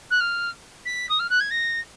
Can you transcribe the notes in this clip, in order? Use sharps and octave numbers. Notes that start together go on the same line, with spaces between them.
F#6
F6
B6
D#6
F6
F#6
G#6
A#6